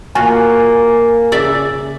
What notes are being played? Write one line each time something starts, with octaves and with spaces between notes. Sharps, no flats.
A#3 F4 F#4 G#5
C#3 D5 E5